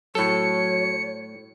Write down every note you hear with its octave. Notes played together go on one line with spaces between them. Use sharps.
A2 F#3 A4 C#5 C#7